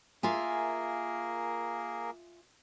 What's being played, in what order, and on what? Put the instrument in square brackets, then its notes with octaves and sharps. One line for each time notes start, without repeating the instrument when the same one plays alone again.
[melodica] A#3 G#4 A#4 [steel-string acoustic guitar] F4 E5 G#5